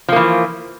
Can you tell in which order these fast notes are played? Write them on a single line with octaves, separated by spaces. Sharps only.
F3 A#3 E3